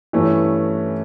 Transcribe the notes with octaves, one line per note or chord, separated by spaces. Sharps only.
G2 E3 A3 C#4